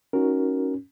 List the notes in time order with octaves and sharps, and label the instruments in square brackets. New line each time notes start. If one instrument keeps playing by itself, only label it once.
[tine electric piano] C#4 [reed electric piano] D#4 F#4 A#4